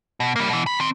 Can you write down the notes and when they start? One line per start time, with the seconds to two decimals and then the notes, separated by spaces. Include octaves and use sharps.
0.20 B2
0.36 G3 A#3
0.49 B2 E3
0.66 F#2 B5
0.80 D#3 C4